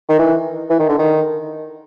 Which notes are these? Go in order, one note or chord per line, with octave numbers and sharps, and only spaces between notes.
D#3
E3
E3
D#3
D3
D#3